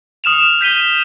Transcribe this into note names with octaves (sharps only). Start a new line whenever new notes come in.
D#6 F6 E7 F7
G6 B6 D#7 G7